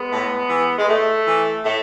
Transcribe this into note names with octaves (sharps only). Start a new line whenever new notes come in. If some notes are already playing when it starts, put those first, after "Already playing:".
Already playing: G#3 B3
A2
E3
G#3
A2 A3
E3
A2 A3